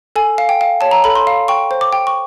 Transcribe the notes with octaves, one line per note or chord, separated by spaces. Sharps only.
A4 G#5
F5
G5
F5
C#5 A5
A#5
A4 B5
C6
F5
G5 C#6
C5
D6
G5
C#6